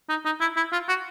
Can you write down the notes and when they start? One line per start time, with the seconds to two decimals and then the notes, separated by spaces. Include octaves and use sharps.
0.09 D#4
0.25 D#4
0.41 E4
0.56 E4
0.72 F4
0.89 F#4